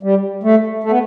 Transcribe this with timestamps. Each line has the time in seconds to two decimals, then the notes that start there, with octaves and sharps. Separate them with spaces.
0.03 G3
0.43 A3
0.84 A3
0.91 B3